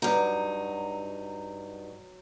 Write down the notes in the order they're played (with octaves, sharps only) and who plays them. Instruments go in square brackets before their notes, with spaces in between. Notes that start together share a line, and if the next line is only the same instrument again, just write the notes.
[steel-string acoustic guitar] G2 D#4 [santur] F#3